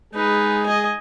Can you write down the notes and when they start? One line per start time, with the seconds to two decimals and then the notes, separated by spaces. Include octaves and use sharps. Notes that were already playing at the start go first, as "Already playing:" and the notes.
0.14 G#3 D#4 G#4 B4
0.66 D#5 G#5